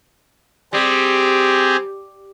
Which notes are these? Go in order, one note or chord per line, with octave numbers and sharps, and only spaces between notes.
G3 C4 G4 G#4